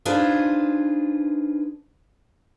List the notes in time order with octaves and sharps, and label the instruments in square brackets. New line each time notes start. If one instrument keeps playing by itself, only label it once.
[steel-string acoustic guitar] D4 D#4 F4 G#4 B4 C5